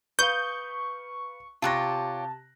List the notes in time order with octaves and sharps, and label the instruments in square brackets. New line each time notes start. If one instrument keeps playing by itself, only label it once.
[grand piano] B4 F5 [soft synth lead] C#6 [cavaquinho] D#6 [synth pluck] G6
[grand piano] C3 F#6 A#6 [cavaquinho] F4 G4 C#5 [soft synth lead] A5